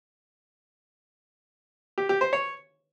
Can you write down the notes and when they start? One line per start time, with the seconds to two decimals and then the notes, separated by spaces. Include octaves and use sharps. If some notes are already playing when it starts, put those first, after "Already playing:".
1.98 G4
2.09 G4
2.21 C5
2.33 C#5